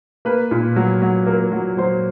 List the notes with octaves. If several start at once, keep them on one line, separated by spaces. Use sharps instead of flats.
A#3 B4
A#2
F#3
F#3
A#3
F#3
F#3 C5